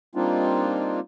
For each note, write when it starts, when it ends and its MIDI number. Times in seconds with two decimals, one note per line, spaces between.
0.15 1.00 55
0.15 1.00 58
0.15 1.00 60
0.15 1.00 62
0.15 1.00 63
0.15 1.00 65